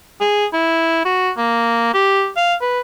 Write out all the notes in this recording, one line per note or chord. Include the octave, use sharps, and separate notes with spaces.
G#4
E4
F#4
A#3
G4
F5
B4